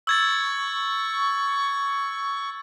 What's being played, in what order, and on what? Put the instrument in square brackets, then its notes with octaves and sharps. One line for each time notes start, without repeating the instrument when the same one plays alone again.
[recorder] C#6 [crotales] E6 G#6 A6